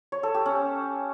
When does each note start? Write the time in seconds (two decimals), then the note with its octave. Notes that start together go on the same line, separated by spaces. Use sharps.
0.12 C#5
0.23 A4
0.34 G4
0.46 C#4